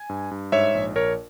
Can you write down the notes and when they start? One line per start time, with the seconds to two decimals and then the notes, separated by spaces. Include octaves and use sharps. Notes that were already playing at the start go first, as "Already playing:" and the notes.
Already playing: G#5
0.09 G2
0.31 G2
0.52 G#2 C#5 E5
0.75 A#1
0.96 A#1 A#4 C#5